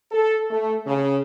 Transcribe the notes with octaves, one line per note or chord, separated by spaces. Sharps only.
A4
A3
C#3